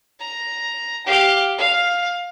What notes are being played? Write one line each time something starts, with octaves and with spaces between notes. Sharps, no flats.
A#5
G4 F5
F5